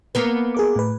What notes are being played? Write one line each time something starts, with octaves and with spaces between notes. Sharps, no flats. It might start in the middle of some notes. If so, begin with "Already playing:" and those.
A#3 B3 B4
G#4 A#4 D6
A2 B4